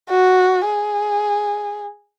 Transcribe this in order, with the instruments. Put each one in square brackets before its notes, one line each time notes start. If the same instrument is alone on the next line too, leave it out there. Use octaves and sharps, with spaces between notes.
[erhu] F#4
G#4